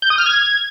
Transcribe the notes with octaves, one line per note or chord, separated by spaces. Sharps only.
G6
D#6
F6
G#6